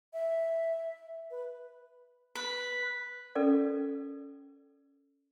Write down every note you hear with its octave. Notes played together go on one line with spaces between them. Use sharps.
E5
B4
B4
C#4 A4 A#4 D5